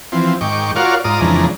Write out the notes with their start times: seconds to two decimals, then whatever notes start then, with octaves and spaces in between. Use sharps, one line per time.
0.12 E3 F3 C4
0.41 G#2 D#3 G5 C#6 D6
0.76 F4 F#4 A#4 C#5 D5 F5
1.04 G#2 F4 D5 A#5 D#6
1.20 F2 C#3 E3 G#3 D4 A#5